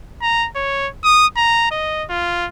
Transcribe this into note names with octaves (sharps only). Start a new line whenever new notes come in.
A#5
C#5
D#6
A#5
D#5
F4